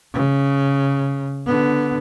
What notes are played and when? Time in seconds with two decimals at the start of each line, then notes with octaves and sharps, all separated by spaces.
0.13 C#3
1.46 D3 B3